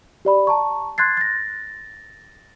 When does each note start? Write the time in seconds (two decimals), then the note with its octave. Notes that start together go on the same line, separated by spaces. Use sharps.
0.25 G4 D5 B5
0.47 A5 A#5 C#6
0.98 C6 F#6 G#6 A6 C7
1.17 A6 A#6